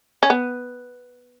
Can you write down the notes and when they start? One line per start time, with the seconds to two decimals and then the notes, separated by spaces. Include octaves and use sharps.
0.23 C#4
0.30 B3